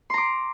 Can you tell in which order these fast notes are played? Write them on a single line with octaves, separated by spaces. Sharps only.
C6 A#5 D6